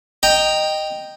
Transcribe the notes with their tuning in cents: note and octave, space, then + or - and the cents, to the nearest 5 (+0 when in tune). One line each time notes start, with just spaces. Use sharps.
D#5 -10 G5 +0 A#5 +0